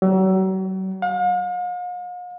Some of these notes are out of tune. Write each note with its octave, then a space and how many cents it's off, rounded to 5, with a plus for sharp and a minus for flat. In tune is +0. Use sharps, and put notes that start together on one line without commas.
F#3 +40
F5 +45